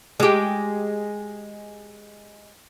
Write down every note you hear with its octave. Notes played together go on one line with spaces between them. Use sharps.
G#3 G4